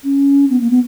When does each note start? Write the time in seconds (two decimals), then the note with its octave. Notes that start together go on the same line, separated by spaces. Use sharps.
0.04 C#4
0.50 B3
0.61 A#3
0.70 B3